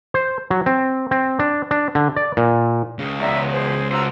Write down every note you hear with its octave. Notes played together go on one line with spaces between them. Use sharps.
C5
F#3
C4
C4
D4
D4
D3
D5
A#2
C#2 C#3
E2 B2 D5 E5 A#5
G#4 C5
F#4 C5 A#5 C6 E6